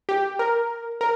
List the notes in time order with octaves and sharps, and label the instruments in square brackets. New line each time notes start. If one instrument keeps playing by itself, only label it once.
[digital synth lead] G4
A#4
A#4